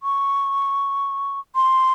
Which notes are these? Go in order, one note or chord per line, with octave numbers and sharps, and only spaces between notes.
C#6
C6